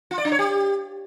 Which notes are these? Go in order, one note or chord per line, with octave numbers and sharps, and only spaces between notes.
F4
D5
D4
C#5
G4